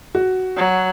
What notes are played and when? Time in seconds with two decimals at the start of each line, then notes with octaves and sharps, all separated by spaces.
0.15 F#4
0.57 F#3